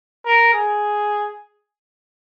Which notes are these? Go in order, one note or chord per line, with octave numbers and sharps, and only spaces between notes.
A#4
G#4